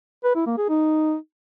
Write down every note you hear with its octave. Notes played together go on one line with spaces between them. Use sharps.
B4
E4
A#3
G#4
D#4